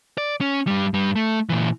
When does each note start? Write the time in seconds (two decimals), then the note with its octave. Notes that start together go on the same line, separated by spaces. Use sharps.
0.18 D5
0.41 C#4
0.67 G2 G3
0.94 G2 G3
1.16 A3
1.49 A#2 E3